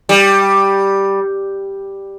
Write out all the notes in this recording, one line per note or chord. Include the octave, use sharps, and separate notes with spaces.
G3